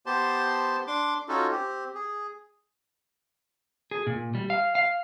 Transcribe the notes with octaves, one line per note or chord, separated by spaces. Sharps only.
B3 G4 C5 A5 C6
D4 C6 D6
C#4 D#4 F4 F#4 A4
C4 G4
G#4
G#4
A#2
G3
F5
F5